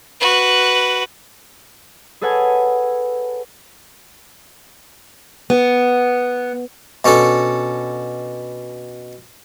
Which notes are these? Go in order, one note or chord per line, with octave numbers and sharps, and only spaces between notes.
F#4 B4
G#4 A4 B4 C#5 F#5 G#5
B3
B2 C#4 D4 A4